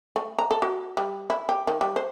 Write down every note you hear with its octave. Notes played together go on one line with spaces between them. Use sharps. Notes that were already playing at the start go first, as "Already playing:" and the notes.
A3
A#5
A4
F#4
G3
E4
G4
D#3
G3
C5